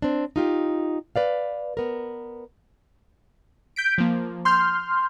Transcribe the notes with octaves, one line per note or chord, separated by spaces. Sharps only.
C4 D4
D#4 F4 G4
B4 D5 F5
B3 A#4
G6 B6 D7
F3 A#3
C6 F6 G6